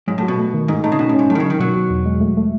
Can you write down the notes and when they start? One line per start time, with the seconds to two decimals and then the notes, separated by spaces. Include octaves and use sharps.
0.08 G#2 F#3
0.18 A2
0.22 F#4
0.28 B2
0.38 A3
0.54 D#3
0.68 G#2 D#4
0.84 A2 D#4
0.92 C#3
0.99 B2 C#4
1.09 A2
1.14 G#2 C#4
1.29 A2 F#3
1.35 D#3
1.40 C#3
1.46 D#3 D#4
1.60 B2 F#3
1.76 B2
1.90 E2
2.06 G#3
2.21 A3
2.37 A3